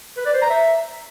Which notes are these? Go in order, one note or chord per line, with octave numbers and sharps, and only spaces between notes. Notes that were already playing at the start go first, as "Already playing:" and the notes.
B4
D5
C5
A#5
E5